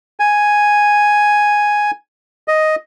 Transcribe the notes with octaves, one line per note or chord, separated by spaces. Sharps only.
G#5
D#5